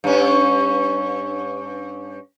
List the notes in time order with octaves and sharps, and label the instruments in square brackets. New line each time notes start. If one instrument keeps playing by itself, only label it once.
[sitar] G2 C#4